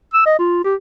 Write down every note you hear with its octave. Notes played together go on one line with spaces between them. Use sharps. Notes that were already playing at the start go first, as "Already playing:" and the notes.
E6
D#5
F4
G4